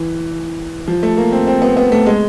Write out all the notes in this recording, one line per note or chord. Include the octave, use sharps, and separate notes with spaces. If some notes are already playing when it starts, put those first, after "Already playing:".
Already playing: E3
F3
A3
A#3
C4
C4
B3
B3
A3
G#3